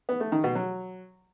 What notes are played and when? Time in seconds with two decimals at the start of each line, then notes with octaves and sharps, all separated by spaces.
0.09 B3
0.20 A3
0.32 D#3
0.44 B2
0.55 F#3